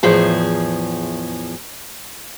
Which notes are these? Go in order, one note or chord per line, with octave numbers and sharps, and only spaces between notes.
E2 A2 F3 G#4